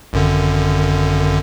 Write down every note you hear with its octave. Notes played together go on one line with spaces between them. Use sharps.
G#1 F#2 D3